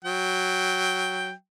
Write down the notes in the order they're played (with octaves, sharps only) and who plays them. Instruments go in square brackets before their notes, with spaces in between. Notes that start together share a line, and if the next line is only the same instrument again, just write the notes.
[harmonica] F#3 G5